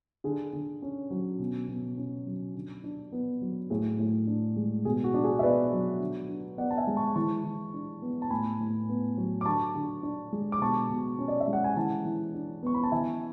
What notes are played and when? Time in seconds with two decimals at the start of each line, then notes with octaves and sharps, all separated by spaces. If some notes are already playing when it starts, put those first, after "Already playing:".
0.24 D3 G#4
0.53 D3
0.82 C#4
1.11 F#3
1.39 B2
1.68 B2
1.97 C#4
2.27 F#3
2.54 D3
2.84 D4
3.12 B3
3.41 F#3
3.70 A2 G#4
3.99 A2
4.27 D4
4.56 G#3
4.85 B2 G#4
5.04 F#4
5.14 D4
5.24 G#4
5.39 E5
5.42 B3 B4 D5
5.72 F#3
6.00 D3
6.29 D4
6.58 B3 D5 F#5
6.71 A5
6.77 E5 G#5
6.87 G#3
6.97 A5 C#6
7.15 E3 A5 C#6
7.44 E3
7.74 D4
8.02 B3
8.22 A5
8.30 A2 G#5 B5
8.60 A2
8.89 B3
9.17 F#3
9.41 D6
9.46 D3 A5 C#6
9.75 D3
10.03 D4
10.33 G#3
10.52 D6
10.61 B2 A5 C#6
10.90 B2
11.19 C#4
11.28 D5
11.40 E5
11.48 G#3
11.53 F#5
11.64 G#5
11.76 E3 F#5 A5
12.05 E3
12.34 D4
12.63 B3 C#6
12.74 B5
12.83 A5
12.92 E3 E5 G#5